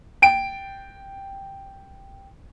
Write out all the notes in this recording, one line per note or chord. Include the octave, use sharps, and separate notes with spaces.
G5 D7